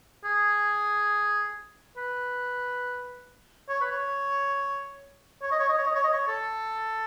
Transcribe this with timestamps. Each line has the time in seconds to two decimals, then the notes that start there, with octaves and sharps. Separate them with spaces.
0.24 G#4
1.97 B4
3.69 C#5
3.81 B4
3.91 C#5
5.42 C#5
5.51 D#5
5.59 C#5
5.69 D#5
5.78 C#5
5.86 D#5
5.95 C#5
6.04 D#5
6.13 C#5
6.28 A4